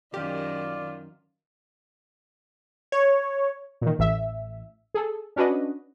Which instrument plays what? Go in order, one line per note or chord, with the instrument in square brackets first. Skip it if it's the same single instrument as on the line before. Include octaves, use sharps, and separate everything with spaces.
[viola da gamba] F#2 D#3 [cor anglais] F4 [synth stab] G4 [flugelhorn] D5
[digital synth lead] C#5
[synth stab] A#2 D#3
A1 E5
G#4 A4
C#4 D4 F#4 B4 D#5